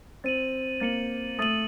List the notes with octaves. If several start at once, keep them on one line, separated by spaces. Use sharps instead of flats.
C4 A6 D#7 F#7
A#3 A6 C#7 F#7
A3 D#6 A6 D#7 F#7